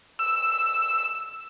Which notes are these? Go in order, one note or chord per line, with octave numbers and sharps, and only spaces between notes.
E6